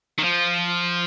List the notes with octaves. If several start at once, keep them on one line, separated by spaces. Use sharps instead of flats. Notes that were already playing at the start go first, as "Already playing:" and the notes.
D#3
F3